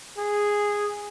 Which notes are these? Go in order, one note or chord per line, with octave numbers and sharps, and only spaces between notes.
G#4